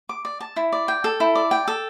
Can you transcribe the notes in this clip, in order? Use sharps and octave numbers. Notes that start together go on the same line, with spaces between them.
D6
D5
A5
E4
D5
G5
A4
E4
D5
G5
A4